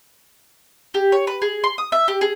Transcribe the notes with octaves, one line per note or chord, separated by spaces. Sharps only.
G4
C#5
B4
G#4
C6
D#6
E5
G4
G#4